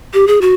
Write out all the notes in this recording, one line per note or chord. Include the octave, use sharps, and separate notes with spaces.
G4
G#4
F#4